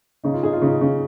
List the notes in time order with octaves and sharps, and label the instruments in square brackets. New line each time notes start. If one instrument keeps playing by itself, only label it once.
[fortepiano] C#3 [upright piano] D#4
[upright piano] F4
[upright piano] D#4 [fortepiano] G#4
[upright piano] F4
[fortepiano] C#3 [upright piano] D#4
[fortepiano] C#3